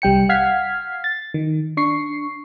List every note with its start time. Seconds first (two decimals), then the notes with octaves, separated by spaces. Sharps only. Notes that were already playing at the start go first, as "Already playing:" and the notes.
0.02 C2 G3 G5 C#7
0.29 F5 F#5 F6 G#6 B6 C7
1.04 A6
1.34 D#3
1.77 D4 C#6 C7